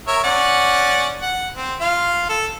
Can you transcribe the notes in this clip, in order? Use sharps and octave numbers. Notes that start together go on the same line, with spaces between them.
A#4 C#5 E5
C#4 D5 F#5
F#5
C4
F4 F5
A4